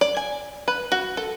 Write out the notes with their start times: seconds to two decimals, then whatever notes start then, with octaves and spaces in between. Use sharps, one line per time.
0.01 D5
0.17 G#5
0.68 B4
0.92 F#4
1.17 A4